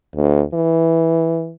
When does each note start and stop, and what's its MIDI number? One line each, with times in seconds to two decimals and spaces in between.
0.16 0.42 38
0.54 1.52 52